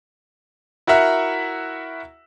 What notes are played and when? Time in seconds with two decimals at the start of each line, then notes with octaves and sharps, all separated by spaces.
0.87 E4 F#4 A#4 E5 F#5